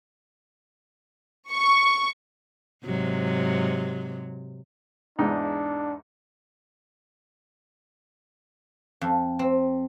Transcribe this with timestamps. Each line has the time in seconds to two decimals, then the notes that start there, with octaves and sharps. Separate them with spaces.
1.51 C#6
2.85 G#2 C3 F#3
5.19 E2 G#2 D4 D#4
9.01 F2
9.39 C4